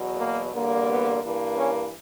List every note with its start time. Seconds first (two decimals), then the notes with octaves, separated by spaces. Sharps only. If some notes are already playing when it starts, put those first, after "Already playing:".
Already playing: E2 B2 F#3
0.18 A#3
0.52 E2 D3 G3 A#3
0.87 B3
1.22 G2 E3 A#3
1.57 C#4